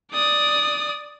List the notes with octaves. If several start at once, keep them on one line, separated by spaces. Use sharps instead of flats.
D5 D#6